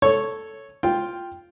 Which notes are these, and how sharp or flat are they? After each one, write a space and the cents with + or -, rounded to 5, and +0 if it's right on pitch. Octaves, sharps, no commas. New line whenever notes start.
A4 +0 C#5 +0
F4 +0 G5 +0